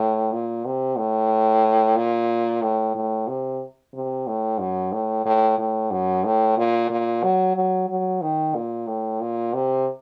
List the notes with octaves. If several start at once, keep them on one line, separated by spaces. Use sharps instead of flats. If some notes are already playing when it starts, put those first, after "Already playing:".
Already playing: A2
A#2
C3
A2
A#2
A2
A2
C3
C3
A2
F#2
A2
A2
A2
F#2
A2
A#2
A#2
F#3
F#3
F#3
D#3
A#2
A2
A#2
C3